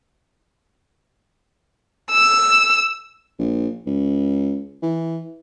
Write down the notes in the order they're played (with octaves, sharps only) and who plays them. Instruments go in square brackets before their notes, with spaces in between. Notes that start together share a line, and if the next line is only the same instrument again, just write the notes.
[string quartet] E6
[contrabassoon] A#1
C#2
E3